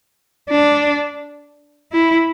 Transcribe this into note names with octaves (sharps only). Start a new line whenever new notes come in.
D4
E4